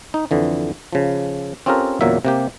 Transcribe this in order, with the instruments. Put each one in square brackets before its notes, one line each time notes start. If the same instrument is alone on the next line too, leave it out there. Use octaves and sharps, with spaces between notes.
[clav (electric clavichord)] D#4
F2 D3 E3
C#3 F3
C4 C#4 F4 G4 A4 A#4
E2 A#2 C#3 F#3 A#3 E5
C3 A#3 G4